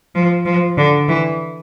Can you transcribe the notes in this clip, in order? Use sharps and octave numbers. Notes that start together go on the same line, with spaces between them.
F3
F3
D3
E3